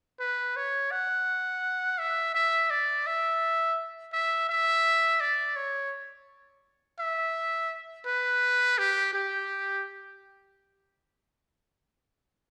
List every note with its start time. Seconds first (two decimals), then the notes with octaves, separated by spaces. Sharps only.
0.20 B4
0.56 C#5
0.91 F#5
1.99 E5
2.34 E5
2.70 D5
3.06 E5
4.13 E5
4.49 E5
5.20 D5
5.56 C#5
6.99 E5
8.06 B4
8.78 G4
9.13 G4